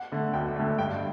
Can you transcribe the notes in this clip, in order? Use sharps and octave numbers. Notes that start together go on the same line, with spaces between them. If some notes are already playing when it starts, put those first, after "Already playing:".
Already playing: F#5
D3 A3
D2 G5
D3 A3
G2 G5